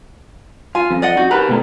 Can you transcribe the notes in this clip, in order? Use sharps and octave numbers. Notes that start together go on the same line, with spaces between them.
F4 G#5
F2
D5 D#5 F#5
D#4 F#4
G4 A#4 B4
B2 A3